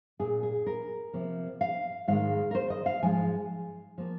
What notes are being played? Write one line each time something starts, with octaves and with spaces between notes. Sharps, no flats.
A#2 A#3 G#4
G#4
A#4
C3 F3 A#3
F5
G#2 D#3 G#3 F5
A#4
C5
D#5
F5
G#2 F3 G#3 G#5
F3 A#3